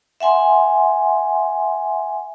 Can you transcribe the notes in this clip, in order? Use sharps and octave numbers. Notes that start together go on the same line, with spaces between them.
E5 F#5 G#5 C6